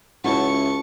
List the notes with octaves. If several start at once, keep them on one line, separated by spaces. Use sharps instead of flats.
C#2 C#4 E4 F#4 A5 C#6